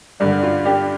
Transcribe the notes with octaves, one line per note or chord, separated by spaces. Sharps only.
G2 D3 D4
F4
D4 G4